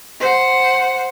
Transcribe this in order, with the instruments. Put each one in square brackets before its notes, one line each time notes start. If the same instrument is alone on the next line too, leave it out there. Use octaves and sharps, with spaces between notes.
[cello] C5 F#5